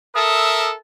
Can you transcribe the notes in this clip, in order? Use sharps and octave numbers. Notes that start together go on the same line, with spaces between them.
A4 A#4 E5 D#6